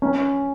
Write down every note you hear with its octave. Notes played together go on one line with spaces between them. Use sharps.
C#4